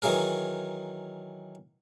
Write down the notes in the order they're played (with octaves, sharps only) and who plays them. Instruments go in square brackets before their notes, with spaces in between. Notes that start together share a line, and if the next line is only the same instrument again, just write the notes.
[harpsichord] D#3 E3 F#3 G#4 A#4